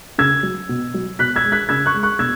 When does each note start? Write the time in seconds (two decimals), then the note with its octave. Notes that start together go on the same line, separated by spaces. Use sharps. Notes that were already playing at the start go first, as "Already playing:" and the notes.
0.18 C#3 E6 G#6
0.43 F#3
0.69 B2
0.94 F#3
1.19 B2 F#6 B6
1.36 E6 G#6
1.44 G#3
1.52 F#6 B6
1.69 C#3 E6 G#6
1.86 C#6 F#6
1.94 G#3
2.03 C#6 F#6
2.19 B2 E6 G#6